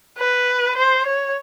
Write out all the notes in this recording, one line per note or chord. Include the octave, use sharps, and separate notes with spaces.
B4
C5
C#5